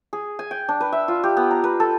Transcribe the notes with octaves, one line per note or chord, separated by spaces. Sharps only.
G#4
G#5
G5
D4
B4
E5
F4
G4
B3
A#5
B4
A4